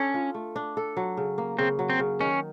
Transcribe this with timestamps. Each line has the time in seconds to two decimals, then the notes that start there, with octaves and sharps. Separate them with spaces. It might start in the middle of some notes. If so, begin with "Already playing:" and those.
Already playing: C#4 D4 A4
0.14 F4
0.34 A3
0.56 D4
0.77 A4
0.97 F#3
1.17 C#3
1.38 A#3
1.59 C#3 C4
1.79 F#3
1.90 C4
1.99 C#3
2.20 D#3 C#4